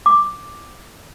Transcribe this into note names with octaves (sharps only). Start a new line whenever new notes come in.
D6